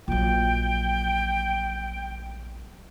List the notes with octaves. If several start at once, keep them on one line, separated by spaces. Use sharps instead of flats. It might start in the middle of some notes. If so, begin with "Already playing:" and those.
A#1 F#3 G5